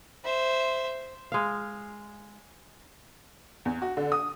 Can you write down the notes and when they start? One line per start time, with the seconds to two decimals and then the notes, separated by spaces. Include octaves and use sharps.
0.24 C5 E5
1.32 G#3 F5
3.65 E2
3.82 F#4
3.97 D3
4.12 D#6